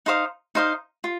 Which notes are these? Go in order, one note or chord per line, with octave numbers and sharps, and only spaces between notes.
D#4 C5 F5 D#6
D#4 C5 F5 D#6
F4